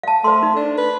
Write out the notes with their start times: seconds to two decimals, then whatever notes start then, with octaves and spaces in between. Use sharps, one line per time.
0.03 F5 A5
0.24 A3 C5 C6
0.43 D#4
0.56 D4
0.78 B4